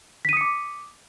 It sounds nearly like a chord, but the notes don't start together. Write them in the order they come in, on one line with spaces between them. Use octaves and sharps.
B6 D#7 D#6 C#7 D6